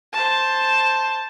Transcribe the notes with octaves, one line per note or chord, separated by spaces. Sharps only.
C5 A5